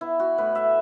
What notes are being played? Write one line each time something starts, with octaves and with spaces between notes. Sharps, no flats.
B3 E4
F#4
A2 B4
E5